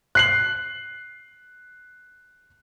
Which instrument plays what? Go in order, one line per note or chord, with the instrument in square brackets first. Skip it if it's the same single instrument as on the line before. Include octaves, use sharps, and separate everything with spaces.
[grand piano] F#6 C7 F#7